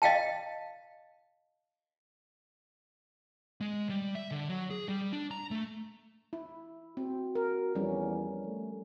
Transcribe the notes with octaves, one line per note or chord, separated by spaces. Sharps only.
D#5 F5 G5 A5
G#3
G3
E5
D3
F#3
G#4
G3
D4
A#5
A3
E4
C4 F#4
A#4
E2 F3 G3 C#4
A3